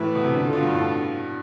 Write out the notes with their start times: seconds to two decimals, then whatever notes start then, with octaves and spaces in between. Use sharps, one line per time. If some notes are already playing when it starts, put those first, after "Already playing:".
Already playing: A2 E3 A3 E4 B4
0.15 B2
0.24 C3
0.33 D3
0.43 D3 A3 D4 F4 A4
0.53 B2
0.63 G2
0.72 A2